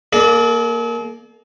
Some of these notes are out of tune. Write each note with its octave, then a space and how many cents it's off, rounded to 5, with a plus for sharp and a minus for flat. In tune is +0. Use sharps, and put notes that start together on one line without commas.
A#3 +0 A4 -45 D5 +25